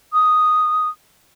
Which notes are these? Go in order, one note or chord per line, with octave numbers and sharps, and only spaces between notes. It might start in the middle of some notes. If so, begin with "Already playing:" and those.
D#6